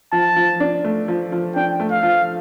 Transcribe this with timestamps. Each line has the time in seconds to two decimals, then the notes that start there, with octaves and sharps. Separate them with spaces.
0.12 F3 A5
0.36 F3
0.60 D4
0.84 A3
1.08 F3
1.32 F3
1.55 D4 G5
1.80 A3
1.91 F5
2.03 F3